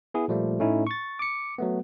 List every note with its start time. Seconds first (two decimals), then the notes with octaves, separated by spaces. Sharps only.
0.14 B3 E4 G#4
0.28 A#2 F3 G3 A3 A#3
0.60 A2 A3 C#4 D#4 E4
0.87 C#6 A6
1.19 D6 C#7
1.58 F#3 A3 B3